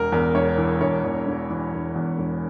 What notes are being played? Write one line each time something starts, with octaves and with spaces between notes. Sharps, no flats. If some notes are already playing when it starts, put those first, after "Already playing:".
Already playing: E1 A#4
E2 A#4
E1 C#5
E3
E1 C#5
E2
E1
E3
E1
E2
E1